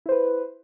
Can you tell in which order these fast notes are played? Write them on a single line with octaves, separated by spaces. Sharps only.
E4 C5 B4